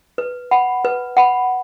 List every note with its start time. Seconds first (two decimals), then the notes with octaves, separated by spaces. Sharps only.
0.18 B4
0.51 F#5 B5
0.85 B4
1.17 F#5 B5